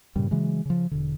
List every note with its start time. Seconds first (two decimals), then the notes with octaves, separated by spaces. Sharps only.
0.16 G2 A#2 C#3 G3
0.31 C#3 E3 F#3 G#3
0.65 C#3 F3
0.91 E1 D3